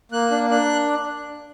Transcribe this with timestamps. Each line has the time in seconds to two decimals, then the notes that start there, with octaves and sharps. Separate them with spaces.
0.12 A#3 F#6
0.31 D4
0.50 D4 F#6